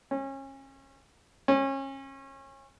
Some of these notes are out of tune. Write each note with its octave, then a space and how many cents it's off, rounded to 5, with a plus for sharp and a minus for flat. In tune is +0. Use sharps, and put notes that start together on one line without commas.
C#4 -30
C#4 -30